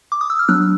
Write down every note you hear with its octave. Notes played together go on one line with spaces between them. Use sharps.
D6
D#6
E6
F6
F#3 B3 D4 E6 F#6